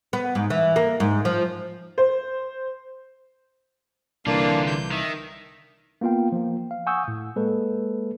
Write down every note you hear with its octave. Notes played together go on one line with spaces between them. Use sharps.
B3
G#2
E3
A#3
G#2
F3
C5
C2 D3 E3 A#3 D4 F4
G6
D#3 E5
A#3 B3 F4 F5 G5
F3 A#3
F5
F#5 G#5 C#6 D#6 E6 G6
A2
G#3 A#3 A4 B4